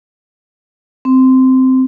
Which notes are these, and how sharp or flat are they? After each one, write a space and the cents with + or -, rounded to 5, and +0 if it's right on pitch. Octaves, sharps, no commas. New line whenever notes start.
C4 -10